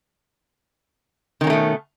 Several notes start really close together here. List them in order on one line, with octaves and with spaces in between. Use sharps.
D#3 C#4 A#3 A3 B2